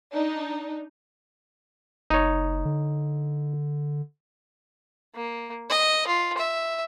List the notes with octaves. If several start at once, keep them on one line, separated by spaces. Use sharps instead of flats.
D4 D#4
F#1 D#4 C#5
D3
A#3
D#5
F4
E5